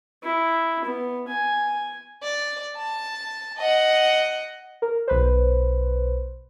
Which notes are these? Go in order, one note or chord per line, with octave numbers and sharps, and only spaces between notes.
E4
B3
G#5
D5
A5
D#5 F#5
A#4
B1 B4 C5